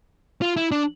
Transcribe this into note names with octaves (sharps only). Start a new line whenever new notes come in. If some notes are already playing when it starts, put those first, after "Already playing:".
F4
E4
D4